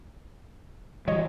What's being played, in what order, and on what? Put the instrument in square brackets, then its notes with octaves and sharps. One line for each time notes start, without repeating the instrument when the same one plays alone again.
[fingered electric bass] E3 F#3 G3 [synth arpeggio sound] C#5 D#5